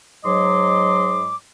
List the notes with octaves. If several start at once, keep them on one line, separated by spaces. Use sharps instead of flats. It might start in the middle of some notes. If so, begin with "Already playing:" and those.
G#2 F#3 C#5 D#5 C6 D6